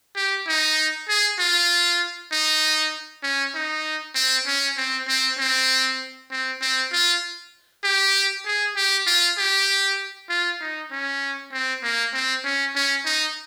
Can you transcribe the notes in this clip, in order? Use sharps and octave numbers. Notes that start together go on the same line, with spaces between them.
G4
D#4
G#4
F4
D#4
C#4
D#4
C4
C#4
C4
C4
C4
C4
C4
F4
G4
G#4
G4
F4
G4
F4
D#4
C#4
C4
A#3
C4
C#4
C#4
D#4